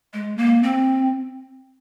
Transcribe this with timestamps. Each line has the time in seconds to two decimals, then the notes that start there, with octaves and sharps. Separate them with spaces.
0.14 G#3
0.38 A#3
0.63 C4